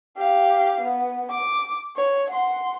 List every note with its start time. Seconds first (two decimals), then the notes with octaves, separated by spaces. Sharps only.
0.17 G4 F5
0.81 B3
1.30 D6
1.97 C#5
2.30 F#5 C6